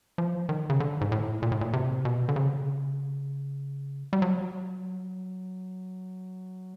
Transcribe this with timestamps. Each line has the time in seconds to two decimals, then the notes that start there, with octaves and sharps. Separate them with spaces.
0.18 F3
0.49 D#3
0.70 C#3
0.80 D3
1.01 G#2
1.12 A2
1.42 A#2
1.52 A2
1.61 A#2
1.73 C3
2.05 B2
2.29 D3
2.36 C#3
4.13 G3
4.22 F#3